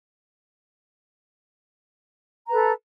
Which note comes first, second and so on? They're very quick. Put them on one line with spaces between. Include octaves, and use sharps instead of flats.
A#5 B4 A4